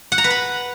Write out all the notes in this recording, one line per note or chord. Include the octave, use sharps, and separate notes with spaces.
F#5
A#5
B4
B5